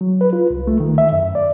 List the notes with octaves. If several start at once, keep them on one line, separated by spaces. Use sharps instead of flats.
F#3
B4
F4
C2
A3
D#3
E5
F#2
D5